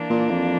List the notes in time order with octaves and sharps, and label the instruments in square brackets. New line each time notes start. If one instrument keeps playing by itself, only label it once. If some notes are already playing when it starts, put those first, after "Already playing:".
Already playing: [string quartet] E3 A#3 D4
[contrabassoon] A#2
F2